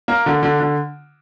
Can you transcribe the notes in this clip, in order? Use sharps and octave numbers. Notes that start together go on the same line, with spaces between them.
A#3
D3
D3
D3